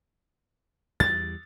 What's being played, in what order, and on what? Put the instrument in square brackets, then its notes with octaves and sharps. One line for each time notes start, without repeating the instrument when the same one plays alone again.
[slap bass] E2 G3 [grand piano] A6